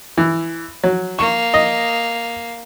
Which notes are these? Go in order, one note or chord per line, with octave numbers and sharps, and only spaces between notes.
E3
F#3
A#3 C#6
D#5